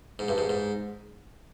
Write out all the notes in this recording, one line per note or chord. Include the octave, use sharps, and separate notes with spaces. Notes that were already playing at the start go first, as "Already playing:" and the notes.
G#2
G2
G#2
G#2